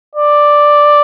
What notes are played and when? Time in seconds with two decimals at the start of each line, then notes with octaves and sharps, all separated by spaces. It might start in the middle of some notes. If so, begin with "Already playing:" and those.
0.16 D5